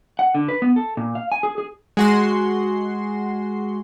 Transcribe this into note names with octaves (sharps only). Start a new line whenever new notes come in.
F#5
D3
B4
B3
A4
A#2
F5
G#5
G#4
G#4
G#3 F#4 C6